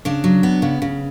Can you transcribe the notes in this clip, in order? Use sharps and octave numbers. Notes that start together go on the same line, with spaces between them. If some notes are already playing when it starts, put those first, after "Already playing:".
C#3 D4
F#3
B3
C#3
C#3